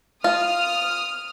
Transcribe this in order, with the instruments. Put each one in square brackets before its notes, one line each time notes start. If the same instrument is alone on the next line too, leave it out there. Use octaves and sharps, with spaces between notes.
[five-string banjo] F4 [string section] D#6 F6